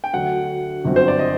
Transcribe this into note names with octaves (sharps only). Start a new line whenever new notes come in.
G5
D2 D3 F#3 F#5
G1 F#2 F#3 C4 F#4
C5
D5
D#5